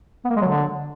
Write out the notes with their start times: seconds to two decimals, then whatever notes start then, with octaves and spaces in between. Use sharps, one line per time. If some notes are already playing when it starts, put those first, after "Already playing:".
0.25 B3
0.30 A#3
0.36 G#3
0.42 F#3
0.47 D3